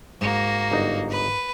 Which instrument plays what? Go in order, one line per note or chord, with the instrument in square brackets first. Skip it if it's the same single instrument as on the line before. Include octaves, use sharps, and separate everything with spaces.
[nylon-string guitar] G#2 [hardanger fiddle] A#3 F#4
[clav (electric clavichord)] G1 D#4
[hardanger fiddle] B4